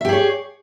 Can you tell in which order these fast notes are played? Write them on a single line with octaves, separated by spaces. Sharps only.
E5 G4 G#4 C#5